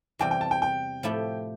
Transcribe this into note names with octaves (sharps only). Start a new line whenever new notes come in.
E2 C3 E3 G3 G5
G5
A5
G5
G5
A2 F3 A3 E4 G4